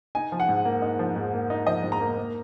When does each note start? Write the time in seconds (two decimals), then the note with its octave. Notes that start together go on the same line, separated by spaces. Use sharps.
0.15 D#4 G#5
0.32 F3
0.40 F#5
0.49 G#2
0.65 A#3
0.82 D#4
0.99 F3
1.16 G#2
1.33 A#3
1.50 D#4
1.67 F3 D#5
1.84 G#2
1.92 A#5
2.00 A#3
2.17 A#3